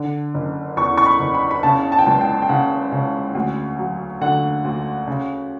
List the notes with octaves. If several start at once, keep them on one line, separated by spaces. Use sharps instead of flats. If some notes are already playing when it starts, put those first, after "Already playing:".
Already playing: D3
F#1
E2 C#6
C#6
B5
F#1
B5
B5
C#3 A5
A5
G5
C#2 A5
G5
G5
C#3 F#5
C#3
D2
F#3
D3 F#5
D2
C#3